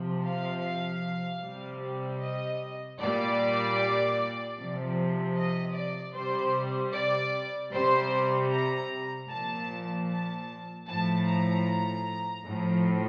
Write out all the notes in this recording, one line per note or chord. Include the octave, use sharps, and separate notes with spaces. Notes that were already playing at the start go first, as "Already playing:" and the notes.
Already playing: C3 F3
F5
C3 G3
D#5
A#2 G3 D5
C3 F3
D#5
D5
C3 G3 C5
D5
C3 G3 C5
A#5
A#2 F3 A5
A5
A2 F3 A5
A#5
A2 F3